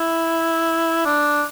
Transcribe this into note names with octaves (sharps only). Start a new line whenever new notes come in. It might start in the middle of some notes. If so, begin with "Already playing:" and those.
Already playing: E4
D4